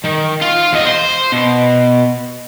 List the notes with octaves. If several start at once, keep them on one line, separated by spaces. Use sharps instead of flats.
D#3
F4
E2 D#5
C5 C6
B2